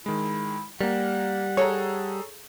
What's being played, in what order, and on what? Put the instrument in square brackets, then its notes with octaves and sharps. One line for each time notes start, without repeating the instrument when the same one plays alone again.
[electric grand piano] D#3 G#3 [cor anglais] E4
[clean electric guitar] G3 [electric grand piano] A#3 A#4 [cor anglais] F#5
[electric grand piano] G#4 A4 A#5 [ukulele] C#5